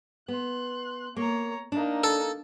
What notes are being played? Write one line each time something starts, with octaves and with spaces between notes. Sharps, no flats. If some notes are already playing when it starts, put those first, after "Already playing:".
B3 C6 F#6
A#3 C#5 A#5
A#3 D4 D#4
A4